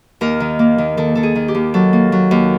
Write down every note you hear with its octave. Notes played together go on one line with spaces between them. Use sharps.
D#2 A#4
D#3
A#3
D#3
D#3 A4
D#3 A4
G#4
D#3
G4
D#2
F#3 A4
A#3
F#3
D#2